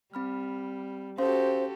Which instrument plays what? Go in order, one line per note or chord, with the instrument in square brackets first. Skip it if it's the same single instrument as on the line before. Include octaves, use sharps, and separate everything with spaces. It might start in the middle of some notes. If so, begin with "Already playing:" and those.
[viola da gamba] G3 [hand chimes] C4 B5 F6
[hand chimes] C#4 F5 C6 [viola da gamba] F#4 G4 A4 [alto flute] C5